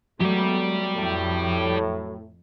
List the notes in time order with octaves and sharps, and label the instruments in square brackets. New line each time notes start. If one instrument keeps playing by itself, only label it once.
[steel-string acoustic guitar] F#3 [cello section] G#3 A3 B3 [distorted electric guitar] G4 D5
[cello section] F2 [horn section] A2